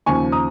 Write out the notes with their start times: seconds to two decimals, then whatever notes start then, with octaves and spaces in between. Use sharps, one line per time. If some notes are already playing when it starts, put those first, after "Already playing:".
0.06 D#2 C#3 F3 G#5 C#6
0.32 A#5 D#6